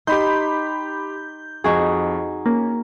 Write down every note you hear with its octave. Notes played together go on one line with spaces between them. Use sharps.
D#4 G4 B5 C6 G6
F2 D#4 F#4 G#4
A#3 C#4